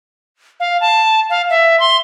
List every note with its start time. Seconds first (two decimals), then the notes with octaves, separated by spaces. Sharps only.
0.60 F5
0.81 A5
1.30 F5
1.50 E5
1.80 C6